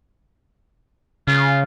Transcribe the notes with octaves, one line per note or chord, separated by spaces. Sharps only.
C#3 F4